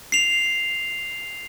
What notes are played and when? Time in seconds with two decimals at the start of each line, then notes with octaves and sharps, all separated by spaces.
0.12 C7 F7